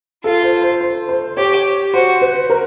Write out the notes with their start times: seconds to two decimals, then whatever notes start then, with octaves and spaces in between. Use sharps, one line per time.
0.24 F4 A4
0.43 C5
0.62 C5
0.81 C5
1.09 C5
1.37 G4 C#5
1.94 F#4 C5
2.21 B4
2.50 A#4